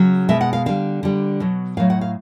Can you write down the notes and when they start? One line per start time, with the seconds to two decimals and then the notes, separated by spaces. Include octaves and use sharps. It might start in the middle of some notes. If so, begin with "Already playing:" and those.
Already playing: C#3 F#3
0.29 B2 G#3 E5
0.41 F#5
0.53 F5
0.66 D3 G3 F5
1.03 D3 G3
1.40 B2 F#3
1.77 A2 F#3 F5
1.90 F#5
2.01 F5